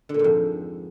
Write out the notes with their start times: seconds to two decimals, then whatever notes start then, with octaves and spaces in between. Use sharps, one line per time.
0.09 D3
0.14 A#2
0.19 G#2
0.24 F2